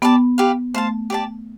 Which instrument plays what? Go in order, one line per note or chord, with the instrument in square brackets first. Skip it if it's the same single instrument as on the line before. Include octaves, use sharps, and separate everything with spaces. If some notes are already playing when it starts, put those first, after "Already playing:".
[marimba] B3 [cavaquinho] G4 D5 A5
[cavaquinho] G4 B4 F5
[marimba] A3 [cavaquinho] C5 F5 A5
[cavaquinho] G4 D5 A5